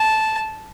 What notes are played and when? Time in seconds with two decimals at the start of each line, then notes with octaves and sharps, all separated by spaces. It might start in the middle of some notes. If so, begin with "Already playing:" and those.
Already playing: A5